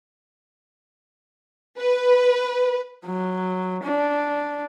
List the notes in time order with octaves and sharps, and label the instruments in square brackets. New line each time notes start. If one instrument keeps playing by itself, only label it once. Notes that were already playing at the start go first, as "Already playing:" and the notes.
[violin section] B4
[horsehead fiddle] F#3
D4